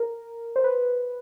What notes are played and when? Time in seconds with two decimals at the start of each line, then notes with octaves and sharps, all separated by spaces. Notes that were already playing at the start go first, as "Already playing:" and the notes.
Already playing: A#4
0.56 C5
0.64 B4